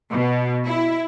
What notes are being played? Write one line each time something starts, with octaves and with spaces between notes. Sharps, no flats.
B2
E4